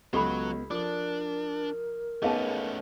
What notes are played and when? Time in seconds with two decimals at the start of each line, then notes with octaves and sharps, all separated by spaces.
0.13 C#2 F#3 B3 G4 A4 B5
0.71 F3 D4 A#4 D6
2.22 A3 B3 C#4 D#4 G#4 F5 A5